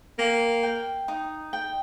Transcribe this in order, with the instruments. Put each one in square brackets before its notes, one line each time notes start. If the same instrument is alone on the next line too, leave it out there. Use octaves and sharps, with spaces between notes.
[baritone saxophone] A#3 [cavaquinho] G5
[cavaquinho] G5
D#4
G5